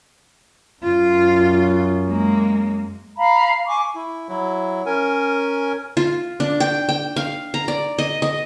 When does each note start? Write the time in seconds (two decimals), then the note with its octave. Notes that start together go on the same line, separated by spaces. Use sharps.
0.83 F#2 F4
2.09 G#3 A#3
3.16 F5 A#5 B5
3.67 G#5 C#6 D6
3.95 E4
4.29 F#3 E4
4.86 C#4 A#4 G#5
5.97 F4
6.40 D4
6.60 G5
6.89 G5
7.16 F5
7.54 A#5
7.68 D5
7.98 D#5
8.22 D#5